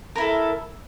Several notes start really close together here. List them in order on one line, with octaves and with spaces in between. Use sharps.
A#4 E4 A4